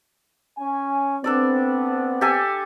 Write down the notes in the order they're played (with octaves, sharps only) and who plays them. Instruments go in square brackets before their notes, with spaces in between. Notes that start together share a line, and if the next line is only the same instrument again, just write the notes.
[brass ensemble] C#4 G#5
[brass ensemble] B3 C4 [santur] D4 A4 D5
[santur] G4 A4 G#5